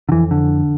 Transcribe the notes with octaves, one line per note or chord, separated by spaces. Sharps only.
D3
F2 E3
D3